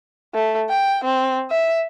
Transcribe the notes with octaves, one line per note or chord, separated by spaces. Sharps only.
A3
G5
C4
E5